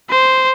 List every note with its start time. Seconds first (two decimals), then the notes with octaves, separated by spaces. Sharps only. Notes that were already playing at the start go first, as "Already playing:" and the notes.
0.10 C5